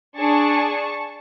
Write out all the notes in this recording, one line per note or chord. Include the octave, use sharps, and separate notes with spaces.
D4 G#4 A5 C#6